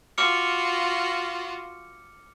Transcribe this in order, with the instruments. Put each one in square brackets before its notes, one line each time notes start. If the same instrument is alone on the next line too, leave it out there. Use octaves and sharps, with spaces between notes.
[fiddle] F4 F#4 [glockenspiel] D6 F6 C#7